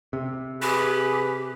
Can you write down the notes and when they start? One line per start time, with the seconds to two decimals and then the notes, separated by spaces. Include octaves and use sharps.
0.13 C3
0.62 G4 G#4 B4